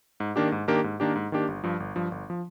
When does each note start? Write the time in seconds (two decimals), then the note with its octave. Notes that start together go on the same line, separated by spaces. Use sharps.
0.20 G#2
0.36 D#3 A#3 D4 G4
0.52 G#2
0.68 D#3 A#3 D4 G4
0.84 G#2
1.00 D#3 A#3 D4 G4
1.16 G#2
1.32 D#3 A#3 D4 G4
1.48 G1
1.64 G2 F3
1.80 G1
1.96 G2 F3
2.12 G1
2.30 F3